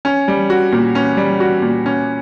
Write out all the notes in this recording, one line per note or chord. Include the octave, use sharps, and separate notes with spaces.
C#4
G3
F#4
A#2
C#4
G3
F#4
A#2
C#4